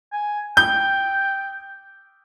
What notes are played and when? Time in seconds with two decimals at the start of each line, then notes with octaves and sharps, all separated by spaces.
0.13 G#5
0.57 G5 G6